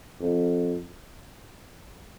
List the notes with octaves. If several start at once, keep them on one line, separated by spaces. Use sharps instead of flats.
F2